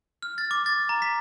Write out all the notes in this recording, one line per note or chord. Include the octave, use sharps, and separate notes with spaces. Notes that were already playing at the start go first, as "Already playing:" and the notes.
F6
A6
D6
A6
A#5
B6